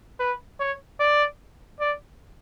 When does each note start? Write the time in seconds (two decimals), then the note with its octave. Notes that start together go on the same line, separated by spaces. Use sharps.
0.19 B4
0.60 C#5
1.00 D5
1.80 D5